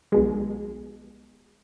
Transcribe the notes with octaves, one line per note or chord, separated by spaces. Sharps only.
B1 B2 G#3